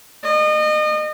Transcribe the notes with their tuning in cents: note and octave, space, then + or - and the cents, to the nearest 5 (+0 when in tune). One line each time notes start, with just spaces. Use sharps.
D#5 -30